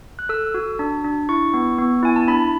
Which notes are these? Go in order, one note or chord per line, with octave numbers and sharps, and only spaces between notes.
F#6
A4 E6
F#4
D4
D4
E4 C#6
B3
B3
E4 G#5
A5
D4 B5